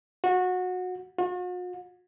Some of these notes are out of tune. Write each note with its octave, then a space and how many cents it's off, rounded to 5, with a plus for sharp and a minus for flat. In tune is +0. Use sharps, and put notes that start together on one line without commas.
F#4 -20
F#4 -45